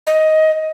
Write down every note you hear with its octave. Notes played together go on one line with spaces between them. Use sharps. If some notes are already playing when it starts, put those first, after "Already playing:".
D#5